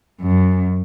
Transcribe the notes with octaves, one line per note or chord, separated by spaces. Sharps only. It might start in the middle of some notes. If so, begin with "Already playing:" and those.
F#2